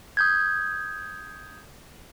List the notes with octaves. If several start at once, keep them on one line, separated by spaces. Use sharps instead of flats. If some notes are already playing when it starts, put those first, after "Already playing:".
D#6 G6 G#6